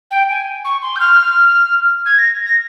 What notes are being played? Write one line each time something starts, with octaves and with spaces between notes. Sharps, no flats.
G5
G#5
C#6
C6
G6
F6
G#6
A#6
A#6